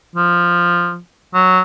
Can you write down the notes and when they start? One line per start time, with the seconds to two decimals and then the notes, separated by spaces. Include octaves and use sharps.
0.15 F3
1.34 F#3